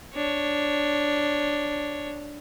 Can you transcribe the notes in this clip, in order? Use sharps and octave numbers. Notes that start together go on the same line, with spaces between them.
D4 C#5